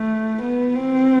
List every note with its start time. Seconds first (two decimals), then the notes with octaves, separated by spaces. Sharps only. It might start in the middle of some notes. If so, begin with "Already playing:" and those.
Already playing: A3
0.42 B3
0.75 C4